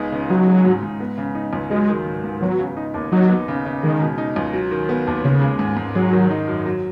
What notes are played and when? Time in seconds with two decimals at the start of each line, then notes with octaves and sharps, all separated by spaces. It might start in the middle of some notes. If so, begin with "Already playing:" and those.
Already playing: C#2 G#3 B3 D#4
0.12 C#3
0.29 F#3 D#4
0.47 G#3
0.65 G#2
0.83 G#2
1.00 B3
1.18 C#3
1.35 D#4
1.53 C#2
1.70 F#3 G#3
1.89 D#3
2.06 G#2
2.24 G#2
2.41 F#3 B3
2.59 C#3
2.77 D#4
2.94 D#2
3.12 F#3 D#4
3.29 B3
3.48 C#3
3.65 C#3
3.83 D#3 G#3
4.01 B2
4.18 D#4
4.36 C#2
4.53 F#3
4.71 D#3
4.89 B3
5.07 D#2
5.24 C#3 C#4
5.42 G#3
5.59 G#2
5.77 G#2
5.95 F#3 G#3
6.13 D#3
6.31 D#4
6.48 F#2
6.66 F#3